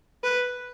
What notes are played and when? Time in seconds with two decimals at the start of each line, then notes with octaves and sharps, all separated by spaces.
0.24 B4